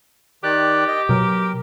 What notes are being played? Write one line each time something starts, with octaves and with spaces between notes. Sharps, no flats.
D#3 G4 D5 F#6
D#5
B2 F#3 A#4